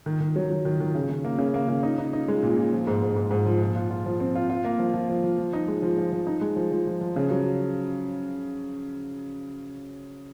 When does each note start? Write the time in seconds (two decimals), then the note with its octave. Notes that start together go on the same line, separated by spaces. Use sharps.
0.06 D#3
0.20 D#3
0.36 F#3
0.50 F#3
0.65 D#3
0.80 D#3
0.95 C#3
1.10 C#3
1.25 A#3
1.38 C#3
1.54 A#3
1.68 C#3
1.83 D#4
1.98 D#4
2.13 D#4
2.28 G#3
2.43 A#2
2.57 A#2
2.73 F3
2.87 G#2
3.02 G#2
3.16 G#2
3.31 G#2
3.46 F3
3.61 A#2
3.76 F4
3.90 F4
4.06 F3
4.20 C4
4.35 F4
4.50 F4
4.64 A#3
4.79 F3
4.93 F3
5.09 F3
5.24 F3
5.38 F3
5.53 D#4
5.68 G#3
5.82 F3
5.98 F3
6.12 F3
6.27 D#4
6.41 G#3
6.56 F3
6.72 F3
6.87 F3
7.01 F3
7.16 C#3
7.31 F#3